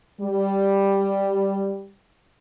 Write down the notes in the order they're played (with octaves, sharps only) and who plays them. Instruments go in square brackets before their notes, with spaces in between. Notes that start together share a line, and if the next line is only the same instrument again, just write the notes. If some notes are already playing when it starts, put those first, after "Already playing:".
[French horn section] G3